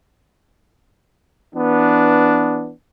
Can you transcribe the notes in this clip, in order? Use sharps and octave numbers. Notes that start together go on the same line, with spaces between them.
E3 B3 D4